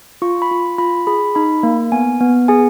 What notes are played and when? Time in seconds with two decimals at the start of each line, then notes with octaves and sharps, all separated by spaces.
0.22 F4 C#6
0.42 B5
0.51 F4
0.78 F4 B5
1.07 G#4 B5
1.35 D#4 B5
1.63 A#3
1.92 B3 G#5
2.20 B3
2.48 G#4 G#5